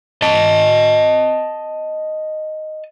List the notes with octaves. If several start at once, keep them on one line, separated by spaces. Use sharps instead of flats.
D#5 A5